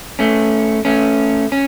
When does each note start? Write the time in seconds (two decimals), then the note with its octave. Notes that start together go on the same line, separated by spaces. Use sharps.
0.19 A3 C#4
0.85 A3 C#4
1.52 C#4